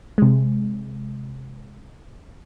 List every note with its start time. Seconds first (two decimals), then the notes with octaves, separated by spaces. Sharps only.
0.18 C3 G#3